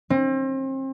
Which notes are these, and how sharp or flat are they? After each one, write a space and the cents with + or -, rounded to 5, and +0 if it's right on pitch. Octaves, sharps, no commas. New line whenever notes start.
C4 +35